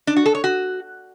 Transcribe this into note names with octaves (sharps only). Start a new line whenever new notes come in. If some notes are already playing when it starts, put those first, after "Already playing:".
D4
F#4
A4
C#5
F#4